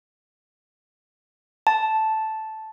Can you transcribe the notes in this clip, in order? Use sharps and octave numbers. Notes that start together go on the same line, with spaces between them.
A5